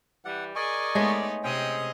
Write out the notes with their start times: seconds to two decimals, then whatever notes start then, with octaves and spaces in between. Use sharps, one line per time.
0.25 E3 G3 F#5
0.55 G#4 A#4 D5 D#5 G#5 C#6
0.95 G#3 A3 B3 D#4 C#5
1.43 C3 C4 C#4 G#4 D#5 G5